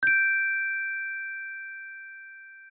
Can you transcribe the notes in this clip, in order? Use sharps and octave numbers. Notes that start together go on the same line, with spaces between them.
G6 D7